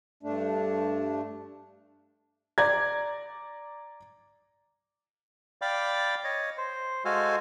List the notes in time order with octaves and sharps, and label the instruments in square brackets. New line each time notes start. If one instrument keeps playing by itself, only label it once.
[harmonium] G2 A3 D4
[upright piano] D5 A#5 G#6
[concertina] D5 F5 G5 B5 D6
C#5 D#5
C5
G#3 F#4 A4 C5 F5 G#5